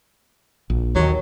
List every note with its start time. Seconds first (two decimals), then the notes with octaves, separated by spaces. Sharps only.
0.70 A#1
0.95 D#2 D#3 F#3